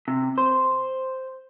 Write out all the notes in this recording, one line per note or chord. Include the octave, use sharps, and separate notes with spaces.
C3
C5